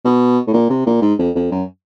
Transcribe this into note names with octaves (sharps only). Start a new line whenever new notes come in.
B2
A2
A#2
C3
A#2
G#2
F2
F2
F#2